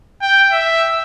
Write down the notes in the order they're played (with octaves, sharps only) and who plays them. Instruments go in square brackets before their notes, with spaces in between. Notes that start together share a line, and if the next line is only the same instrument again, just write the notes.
[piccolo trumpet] G5
E5